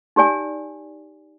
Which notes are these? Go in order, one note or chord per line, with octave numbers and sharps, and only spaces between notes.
D#4 G4 D5 G#5